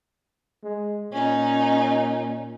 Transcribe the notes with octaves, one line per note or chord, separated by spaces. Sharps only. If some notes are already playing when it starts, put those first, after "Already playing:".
G#3
A#2 C#4 D#4